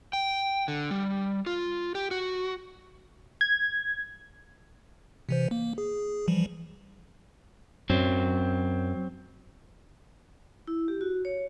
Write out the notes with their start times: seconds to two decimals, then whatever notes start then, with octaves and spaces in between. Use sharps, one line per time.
0.13 G5
0.68 D3
0.91 G3
1.46 F4
1.95 G4
2.11 F#4
3.41 G#6
5.29 C3 E3 C5
5.51 A#3
5.78 G#4
6.28 E3 F3 G3
7.90 F#2 F#3 C4
10.67 E4
10.88 G4
11.01 F#4
11.25 C#5